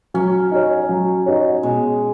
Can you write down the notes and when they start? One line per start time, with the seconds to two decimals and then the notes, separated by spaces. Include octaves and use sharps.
0.14 F#3 C#4
0.52 D#4 F#4 C#5
0.89 F#3
1.26 D#4 F#4 C#5
1.63 B2 G#3